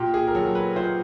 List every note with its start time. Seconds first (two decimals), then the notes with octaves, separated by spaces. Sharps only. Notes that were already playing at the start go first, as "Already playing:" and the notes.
Already playing: A#2 G4
0.14 G#4
0.27 A#4
0.34 F#3 A4
0.55 B4
0.76 A#2 C5